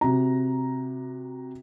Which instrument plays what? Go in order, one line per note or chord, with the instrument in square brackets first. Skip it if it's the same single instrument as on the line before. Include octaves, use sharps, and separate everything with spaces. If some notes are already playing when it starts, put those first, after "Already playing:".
[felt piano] C3 F#4 A#5